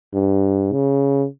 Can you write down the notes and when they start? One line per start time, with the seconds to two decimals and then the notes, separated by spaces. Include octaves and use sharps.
0.14 G2
0.73 C#3